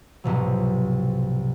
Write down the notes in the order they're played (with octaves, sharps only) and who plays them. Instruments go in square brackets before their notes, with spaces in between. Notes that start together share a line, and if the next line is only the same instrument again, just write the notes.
[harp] C2 G#2 B2 F3 F#3